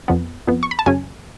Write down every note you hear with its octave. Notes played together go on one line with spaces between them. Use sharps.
F2 F3 B3
F2 F3 B3
C#6
B5
A5
F#2 C#3 F#3 C#4 G#5